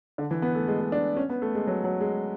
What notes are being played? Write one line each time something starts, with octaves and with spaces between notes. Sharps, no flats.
D3
E3
B3
A3
G#3
G#3
D4
C#4
B3
A3
G#3
F#3
F#3
G#3